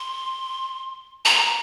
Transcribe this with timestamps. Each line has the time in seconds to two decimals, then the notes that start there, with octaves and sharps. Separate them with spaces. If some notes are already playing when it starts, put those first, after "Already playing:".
Already playing: C6
1.25 A#5